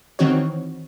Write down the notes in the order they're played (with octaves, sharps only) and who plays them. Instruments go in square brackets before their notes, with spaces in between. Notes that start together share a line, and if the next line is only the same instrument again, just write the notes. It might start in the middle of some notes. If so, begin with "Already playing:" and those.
[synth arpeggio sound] D#3 E3 C4 D#4 F#4 C#5